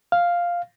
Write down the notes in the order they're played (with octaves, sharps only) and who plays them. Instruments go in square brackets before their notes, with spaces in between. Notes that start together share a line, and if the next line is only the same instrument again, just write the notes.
[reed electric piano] F5